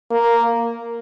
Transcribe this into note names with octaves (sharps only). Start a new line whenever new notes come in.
A#3